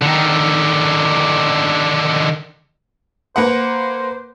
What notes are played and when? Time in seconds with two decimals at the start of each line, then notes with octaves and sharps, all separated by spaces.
0.02 D3 D#3
3.36 A#3 B4 C5 F#5